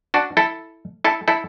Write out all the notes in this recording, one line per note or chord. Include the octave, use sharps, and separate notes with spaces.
D4 F#4
E4 A4
E4 A4
E4 A4